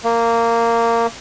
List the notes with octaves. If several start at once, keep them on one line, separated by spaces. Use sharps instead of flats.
A#3